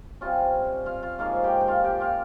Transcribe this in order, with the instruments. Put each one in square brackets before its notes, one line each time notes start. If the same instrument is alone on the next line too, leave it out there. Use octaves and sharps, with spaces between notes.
[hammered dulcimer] C3 G3 C#4 F4
F4 F5
F4 F5
G#2 F3 A#3 C#4 F4 F5
G4 G5
G5
F4 F5
G4 G5
F4 F5